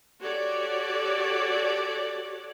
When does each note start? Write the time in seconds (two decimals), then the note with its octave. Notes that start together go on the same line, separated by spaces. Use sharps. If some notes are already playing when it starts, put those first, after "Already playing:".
0.22 F#4 G4 A4 C#5 D5